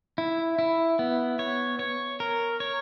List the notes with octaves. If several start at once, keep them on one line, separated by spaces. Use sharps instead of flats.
E4
E4
B3
C#5
C#5
A#4
C#5